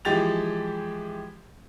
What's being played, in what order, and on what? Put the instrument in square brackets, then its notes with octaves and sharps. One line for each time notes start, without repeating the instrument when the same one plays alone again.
[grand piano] E3 F3 G#3 G4 A6 F7